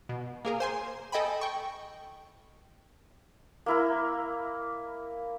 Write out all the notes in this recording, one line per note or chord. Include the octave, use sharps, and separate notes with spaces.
B2
A#3 G#4 A#4
C5 G#5 C6
A4 D#5 G5 G#5 B5
G5 C#6
A#3 E4 A#4